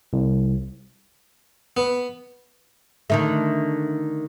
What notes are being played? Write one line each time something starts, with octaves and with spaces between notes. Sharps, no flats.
C2
B3
D3 D#3 A3